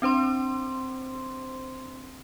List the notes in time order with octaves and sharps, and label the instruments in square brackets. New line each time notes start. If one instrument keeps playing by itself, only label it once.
[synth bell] C4 D4 C5 C6